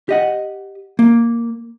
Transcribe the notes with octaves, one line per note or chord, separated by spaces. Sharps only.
G4 D#5 F#5
A#3